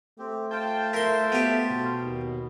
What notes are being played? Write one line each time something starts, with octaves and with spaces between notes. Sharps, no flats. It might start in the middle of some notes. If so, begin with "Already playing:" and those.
A3 C4 G4
F4 C5 G5 A5
A#4 E5 C6
B3 G4
B2
D#2